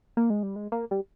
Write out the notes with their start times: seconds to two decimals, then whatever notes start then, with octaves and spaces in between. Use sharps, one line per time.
0.17 A#3
0.30 G#3
0.43 G3
0.56 G#3
0.72 A#3
0.91 G3